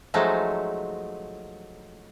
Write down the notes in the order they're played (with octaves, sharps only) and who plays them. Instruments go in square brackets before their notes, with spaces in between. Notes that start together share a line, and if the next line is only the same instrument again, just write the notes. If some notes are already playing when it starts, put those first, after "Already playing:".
[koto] F3 F#3 G#3 A3 D#4